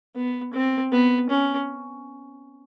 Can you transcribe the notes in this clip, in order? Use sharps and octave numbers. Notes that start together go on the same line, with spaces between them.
B3
C4
B3
C#4